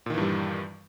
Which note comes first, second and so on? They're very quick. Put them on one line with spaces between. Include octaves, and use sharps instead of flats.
A#2 D#3 E3 G2 G3